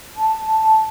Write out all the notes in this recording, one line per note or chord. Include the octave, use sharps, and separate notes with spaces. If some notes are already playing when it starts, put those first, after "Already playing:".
A5